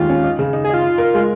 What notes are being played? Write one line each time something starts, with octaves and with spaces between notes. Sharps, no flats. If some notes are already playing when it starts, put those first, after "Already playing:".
Already playing: D#2 G#3 F4
C#4
D#4
C#3
D#4
G#4
D#4 F4
D#4
A#4
G#3